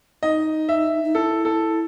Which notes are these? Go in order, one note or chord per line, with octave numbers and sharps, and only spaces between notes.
D#4 D#5
E5
D#4
E4 A4
A4